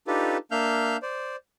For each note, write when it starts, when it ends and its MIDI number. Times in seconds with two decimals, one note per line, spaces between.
0.07 0.37 62
0.07 0.37 63
0.07 0.37 65
0.07 0.37 67
0.07 0.37 69
0.07 0.37 71
0.51 0.97 58
0.51 0.97 62
0.51 0.97 76
0.51 0.97 77
0.51 0.97 89
0.51 0.97 91
1.02 1.36 72
1.02 1.36 74